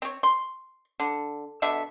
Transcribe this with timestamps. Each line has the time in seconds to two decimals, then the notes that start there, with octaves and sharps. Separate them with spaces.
0.02 C4 C#5
0.23 C6
1.00 D3
1.62 B2 D3 E5